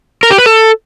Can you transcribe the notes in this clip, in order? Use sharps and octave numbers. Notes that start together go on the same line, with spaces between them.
A#4
G4
B4
A4